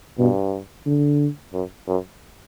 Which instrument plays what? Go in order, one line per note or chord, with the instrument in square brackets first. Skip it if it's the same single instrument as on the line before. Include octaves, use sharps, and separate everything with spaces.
[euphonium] G2 [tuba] B2
[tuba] D3
[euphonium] F#2
F#2